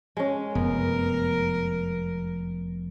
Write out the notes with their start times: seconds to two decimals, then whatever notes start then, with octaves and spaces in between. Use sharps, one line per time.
0.17 G#3 C#4
0.55 F1 F#2 B3 A#4